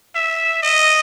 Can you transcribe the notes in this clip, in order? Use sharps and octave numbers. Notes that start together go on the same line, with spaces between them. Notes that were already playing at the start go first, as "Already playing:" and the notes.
E5
D#5